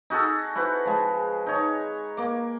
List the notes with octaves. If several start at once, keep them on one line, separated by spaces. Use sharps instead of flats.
D#4 F#4 G#4 A4
E4 F#4 B4 C5
F3 G#3
D#4 C#5
A#3 D6